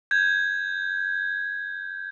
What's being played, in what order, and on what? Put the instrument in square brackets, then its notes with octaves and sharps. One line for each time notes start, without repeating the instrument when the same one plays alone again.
[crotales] G6 G#6